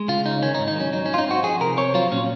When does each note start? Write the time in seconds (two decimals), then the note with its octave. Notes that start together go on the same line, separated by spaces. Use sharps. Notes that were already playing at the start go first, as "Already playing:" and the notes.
Already playing: G#3
0.08 C#3 F4
0.25 C#4 D#4
0.42 D#3 C#4
0.55 D#4
0.59 G#2
0.68 D#4
0.76 F#3 C#4
0.93 F#3 D#4
1.06 C#4
1.10 G#2 F4
1.18 D#4
1.26 C4 F#4
1.43 F3 G#4
1.61 C3 A#4
1.77 C4 C#5
1.94 F#3 F4
2.11 A#2 C#4